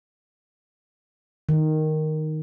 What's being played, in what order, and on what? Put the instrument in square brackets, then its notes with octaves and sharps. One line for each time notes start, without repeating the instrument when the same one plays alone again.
[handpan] D#3